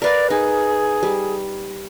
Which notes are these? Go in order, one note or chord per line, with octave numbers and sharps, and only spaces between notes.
A#4 B4 D5 F5
D#4 G#4
G3